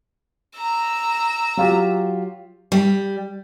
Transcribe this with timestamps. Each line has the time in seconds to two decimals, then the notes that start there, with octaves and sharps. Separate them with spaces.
0.56 A#5 E6
1.57 F#3 F4 G4
2.72 G3